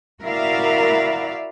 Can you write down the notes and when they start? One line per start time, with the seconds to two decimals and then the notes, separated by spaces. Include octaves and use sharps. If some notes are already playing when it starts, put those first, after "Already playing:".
0.22 E4 F#4 A#4 D5 E5 F5